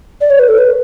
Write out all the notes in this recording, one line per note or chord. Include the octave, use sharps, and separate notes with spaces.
D5
C#5
B4
A4
B4